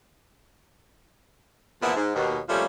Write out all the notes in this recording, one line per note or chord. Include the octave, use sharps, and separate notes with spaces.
E2 A#2 F3 B3 E4
G#2
D#2 B2
C3 F3 G3 A3 A#3 C#4